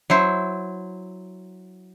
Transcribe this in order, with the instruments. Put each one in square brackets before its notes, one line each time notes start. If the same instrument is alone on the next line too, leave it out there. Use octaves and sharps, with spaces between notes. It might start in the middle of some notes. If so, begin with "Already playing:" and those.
[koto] F#3 E4 C5